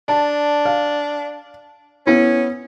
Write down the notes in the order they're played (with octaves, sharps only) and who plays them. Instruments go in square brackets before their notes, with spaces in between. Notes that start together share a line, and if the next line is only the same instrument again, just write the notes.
[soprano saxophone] D4 [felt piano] A5
[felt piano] F5
[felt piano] B3 E4 [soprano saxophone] C#4